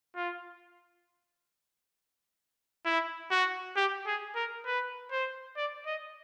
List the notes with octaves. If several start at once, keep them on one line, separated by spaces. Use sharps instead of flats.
F4
E4
F#4
G4
G#4
A#4
B4
C5
D5
D#5